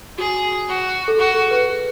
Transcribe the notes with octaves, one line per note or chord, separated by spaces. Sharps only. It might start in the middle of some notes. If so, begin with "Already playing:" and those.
F#4 G#4
F#4
A4
F#4 G#4
A4
B4
G#4